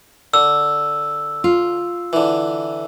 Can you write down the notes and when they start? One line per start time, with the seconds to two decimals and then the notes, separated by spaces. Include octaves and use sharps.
0.34 D3 E6
1.44 F4
2.13 D3 E3